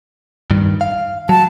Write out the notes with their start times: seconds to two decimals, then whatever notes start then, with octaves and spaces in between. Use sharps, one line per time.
0.51 G2 D#3
0.81 F5
1.29 F#3 A5